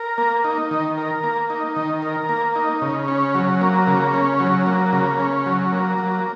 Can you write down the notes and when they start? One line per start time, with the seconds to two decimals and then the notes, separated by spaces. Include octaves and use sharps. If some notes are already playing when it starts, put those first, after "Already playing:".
Already playing: A#4
0.18 A#3
0.44 D#4
0.71 D#3
0.98 A#4
1.24 A#3
1.50 D#4
1.76 D#3
2.02 A#4
2.29 A#3
2.56 D#4
2.82 C#3
3.08 C#4
3.35 F#3
3.61 A#3
3.87 C#3
4.14 C#4
4.40 F#3
4.66 A#3
4.93 C#3
5.20 C#4
5.46 F#3
5.72 A#3
5.98 F#3